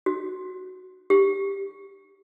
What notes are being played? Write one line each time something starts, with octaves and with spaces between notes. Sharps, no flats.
F#4
G4